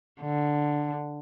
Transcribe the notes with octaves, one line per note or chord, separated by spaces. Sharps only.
D3